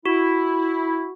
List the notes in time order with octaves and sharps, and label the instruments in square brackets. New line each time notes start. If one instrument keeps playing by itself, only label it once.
[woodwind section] E4 [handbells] F#4